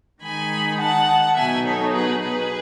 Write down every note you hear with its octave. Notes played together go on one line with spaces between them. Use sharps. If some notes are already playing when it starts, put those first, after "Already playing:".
D#3 G#3 D#4 G#5 B5
F#5 A5
B2 F#3 B3 D#4 E5 G#5
A4 C#5
G#4 B4
G#4 B4